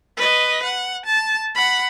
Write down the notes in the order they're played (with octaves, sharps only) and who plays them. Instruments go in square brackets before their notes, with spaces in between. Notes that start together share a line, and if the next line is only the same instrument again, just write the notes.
[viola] B4 D#5
F#5
A5
F#5 B5